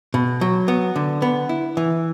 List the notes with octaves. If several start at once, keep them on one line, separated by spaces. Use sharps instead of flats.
B2
F#3
B3
D3
B3
E4
E3